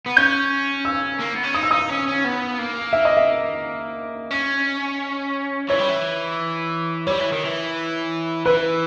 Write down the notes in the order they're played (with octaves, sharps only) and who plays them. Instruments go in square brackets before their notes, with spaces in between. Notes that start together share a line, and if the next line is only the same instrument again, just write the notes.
[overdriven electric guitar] B3
[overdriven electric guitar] C#4 [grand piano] G6
[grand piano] E6
[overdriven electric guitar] A#3
B3
C#4
[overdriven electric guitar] D#4 [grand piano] D#6
[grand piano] E6
[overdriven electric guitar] D#4 [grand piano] D#6
[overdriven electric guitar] C#4
C#4
B3
A#3
[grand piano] E5
D#5
E5
[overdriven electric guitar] C#4
[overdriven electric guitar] E3 [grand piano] C#5
[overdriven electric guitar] G3
E3
[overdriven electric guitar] G3 [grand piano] C#5
[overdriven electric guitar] E3
D#3
E3
[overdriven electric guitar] E3 [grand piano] B4